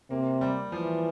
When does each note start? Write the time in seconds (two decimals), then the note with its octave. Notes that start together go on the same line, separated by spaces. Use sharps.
0.10 C3 A#3
0.41 G3
0.72 E3 F3